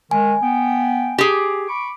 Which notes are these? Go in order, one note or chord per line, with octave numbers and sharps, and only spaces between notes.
D#3 G#3 G#5
B3 G5
G4 G#4
B5 C#6 D6